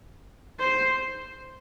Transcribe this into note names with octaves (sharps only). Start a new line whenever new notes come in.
C5